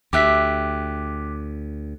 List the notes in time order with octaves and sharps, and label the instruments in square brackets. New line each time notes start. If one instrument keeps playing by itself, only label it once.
[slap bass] D2 [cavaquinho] G4 E5 [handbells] D6 F#6 B6